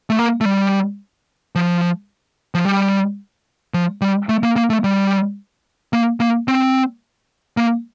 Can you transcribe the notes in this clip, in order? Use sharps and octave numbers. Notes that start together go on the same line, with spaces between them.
A3
A#3
A3
G3
F3
F3
G3
F3
G3
A3
A#3
A#3
A3
G3
A#3
A#3
C4
A#3